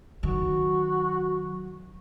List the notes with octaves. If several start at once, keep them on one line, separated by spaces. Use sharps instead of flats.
D#3 F#3 F#4